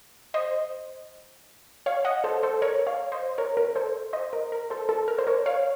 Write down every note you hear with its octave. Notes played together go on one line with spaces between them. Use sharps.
C5 D#5
C#5 F5
D#5 F#5
A4 C5
A4 C5
A#4 C#5
C#5 F5
C5 D#5
A#4 C#5
A#4
A4 C5
C5 D#5
A#4
A#4
A4 C5
A4
A#4
C5
A#4 C#5
C#5 F5